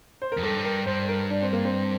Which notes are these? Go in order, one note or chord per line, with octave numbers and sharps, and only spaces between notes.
C5
A#4
F2
G2 A4
A#4
G2 C5
A#4
D4
C4
A#3
C4